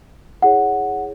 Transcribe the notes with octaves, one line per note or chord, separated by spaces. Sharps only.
E4 G#4 C#5 F#5